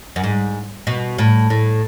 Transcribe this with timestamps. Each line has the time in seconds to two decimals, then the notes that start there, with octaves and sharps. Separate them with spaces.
0.16 F#2
0.23 G#2
0.87 B2
1.18 A2
1.50 A2